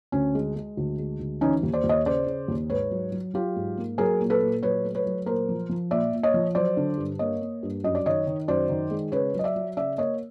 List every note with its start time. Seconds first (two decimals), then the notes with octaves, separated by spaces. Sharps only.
0.12 D2 C#4
0.35 G#3
0.56 G#3
0.77 D2
0.99 G#3
1.19 D2
1.41 E3 C#4 D#4
1.63 D#2
1.73 C5 D5
1.84 D#2
1.89 C#5 D#5
2.06 C#3 C5 D5
2.27 C#3
2.48 D#2
2.70 G#2 B4 C#5
2.91 F#3
3.12 F#3
3.34 F#3 F4 G4
3.56 G#2
3.77 A#3
3.98 F#3 G#4 A#4
4.20 A#2
4.30 A4 B4
4.41 A#2
4.63 F#3 B4 C#5
4.85 A3
4.95 B4 C#5
5.06 F#3
5.26 A#2 A#4 C5
5.49 F3
5.69 F3
5.91 A#2 D5 E5
6.13 A#2
6.23 C#5 D#5
6.34 F3
6.55 F#3 C5 D5
6.77 D3
6.98 G2
7.19 A#3 C#5 D#5
7.41 A#3
7.63 G2
7.84 F#2 D#5
7.95 D5
8.06 D#3 C#5 D#5
8.27 D#3
8.48 F#2 C5 D5
8.69 D#3
8.91 G#3
9.12 C#3 B4 C#5
9.34 F#3 D#5
9.44 D5 E5
9.56 F#3
9.77 C#3 D5 E5
9.98 A#3 C#5 D#5